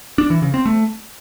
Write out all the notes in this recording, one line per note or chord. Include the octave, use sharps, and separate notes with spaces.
D4
E3
C#3
C4
A3